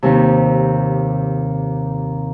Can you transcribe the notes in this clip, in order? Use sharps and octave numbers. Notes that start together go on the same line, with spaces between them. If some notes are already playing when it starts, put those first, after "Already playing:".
D#2 C3